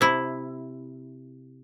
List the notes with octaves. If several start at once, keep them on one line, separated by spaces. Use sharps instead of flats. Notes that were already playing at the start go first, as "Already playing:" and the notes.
C3 E4